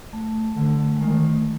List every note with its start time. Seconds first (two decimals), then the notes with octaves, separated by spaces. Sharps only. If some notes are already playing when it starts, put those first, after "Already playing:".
0.13 A3
0.56 D3
0.96 G#3
1.00 D#3 A3
1.23 A3